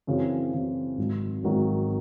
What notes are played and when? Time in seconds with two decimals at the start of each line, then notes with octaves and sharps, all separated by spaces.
0.07 F#2 C#3 E3 C4
0.53 F#2 C#3 E3 C4
0.98 G#1 G#2 D#3 F#3
1.43 G#1 G#2 D#3 F#3